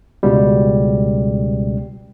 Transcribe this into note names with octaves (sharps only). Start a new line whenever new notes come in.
C#2 B2 G3